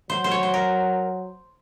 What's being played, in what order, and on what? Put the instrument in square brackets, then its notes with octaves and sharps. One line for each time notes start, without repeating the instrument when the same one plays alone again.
[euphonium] F#3 [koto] C5
[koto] C5
C#5
C5
A#4